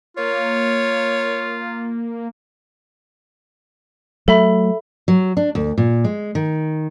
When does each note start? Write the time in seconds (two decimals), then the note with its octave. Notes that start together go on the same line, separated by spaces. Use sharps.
0.17 A#3 F4 C#5
4.28 F#3 A3 A4 E5 B5
5.08 F#3
5.37 D4
5.55 D2
5.78 A#2
6.04 G#3
6.35 D#3